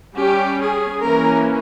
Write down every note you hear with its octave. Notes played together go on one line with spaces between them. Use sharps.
G3 C#4 G4
G#4
E3 A#3 C#4 A#4